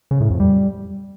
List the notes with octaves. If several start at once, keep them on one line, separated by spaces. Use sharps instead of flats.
C#3
A2
F2
G3